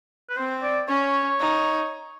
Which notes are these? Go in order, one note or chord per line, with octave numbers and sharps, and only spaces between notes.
B4
C4 C5
D5
C#4 C#5
D#4